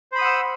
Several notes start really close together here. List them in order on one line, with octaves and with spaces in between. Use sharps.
C5 B5 D#6 F#5 E6